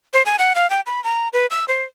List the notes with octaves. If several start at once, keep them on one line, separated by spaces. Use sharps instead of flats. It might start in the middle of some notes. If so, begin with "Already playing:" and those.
C5
G#5
F#5
F5
G5
B5
A#5
B4
E6
C5